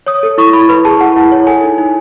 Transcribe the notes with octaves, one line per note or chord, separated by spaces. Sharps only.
C#5 D#6
A4
E4 C#6
E4 B5
B4 B5
G#4 A5
E4 F#5
E4
C#5
A4 G#5
D#4
D#4